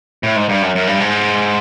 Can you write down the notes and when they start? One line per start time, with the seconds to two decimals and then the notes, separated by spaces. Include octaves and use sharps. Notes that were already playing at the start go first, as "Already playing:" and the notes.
0.23 A2
0.36 G#2
0.49 G2
0.62 F#2
0.75 F#2
0.87 G2
1.00 G#2